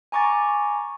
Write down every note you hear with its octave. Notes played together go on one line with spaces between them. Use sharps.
G#5 A#5 C#6 D6 A6